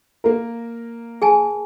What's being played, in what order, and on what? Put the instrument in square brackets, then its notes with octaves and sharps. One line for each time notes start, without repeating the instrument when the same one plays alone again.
[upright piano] A#3 A#4
[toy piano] G#4 G#5 A5